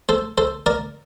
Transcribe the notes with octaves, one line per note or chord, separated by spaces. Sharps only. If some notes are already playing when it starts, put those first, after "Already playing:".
A4 C5
A4 C5
A#4 D5